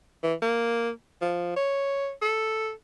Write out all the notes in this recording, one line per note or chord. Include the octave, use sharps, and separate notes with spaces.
E3
A#3
F3
C#5
A4